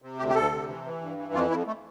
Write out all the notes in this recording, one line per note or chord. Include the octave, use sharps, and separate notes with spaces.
C3
D2 G4
G4
D2 A4
C3
E3
E3
G2
E3
F2 F4
F2 E4
A3